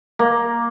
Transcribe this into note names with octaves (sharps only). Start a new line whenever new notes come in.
A#3